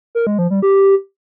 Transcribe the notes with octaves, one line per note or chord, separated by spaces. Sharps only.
A#4
G#3
F3
G3
G4